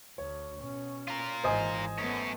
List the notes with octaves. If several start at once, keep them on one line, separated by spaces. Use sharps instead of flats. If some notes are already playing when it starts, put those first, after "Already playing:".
D2 C#5
B2 C#4
F4 A#4
G#1 E3 C5 D#5 G#5
F#2 A3 B3 C#4